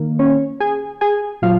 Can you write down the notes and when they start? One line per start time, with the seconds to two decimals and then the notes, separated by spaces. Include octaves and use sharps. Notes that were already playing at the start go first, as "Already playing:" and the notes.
Already playing: D#3 A#3
0.19 C#4 C#5
0.60 G#4 G#5
1.01 G#4 G#5
1.42 A#2 F#3 F4 F5